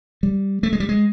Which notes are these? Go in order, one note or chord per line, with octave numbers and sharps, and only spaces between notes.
G3
A3
G#3
G3
G#3